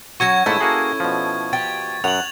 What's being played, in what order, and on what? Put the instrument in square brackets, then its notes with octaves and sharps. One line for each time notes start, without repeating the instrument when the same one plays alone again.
[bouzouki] F#3 C#4 F#4 [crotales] C#6 G#6
[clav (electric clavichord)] G#2 A3 A#3 [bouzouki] C#4 E4 A4
[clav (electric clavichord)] A#3 F#4 G#4
B2 F3
[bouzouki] G4 [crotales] A6
[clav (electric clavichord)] F#2 [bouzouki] F#5 [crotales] F7 F#7